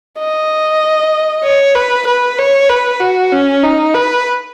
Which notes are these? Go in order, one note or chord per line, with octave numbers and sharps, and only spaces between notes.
D#5
C#5
B4
B4
C#5
B4
F#4
C#4
D#4
B4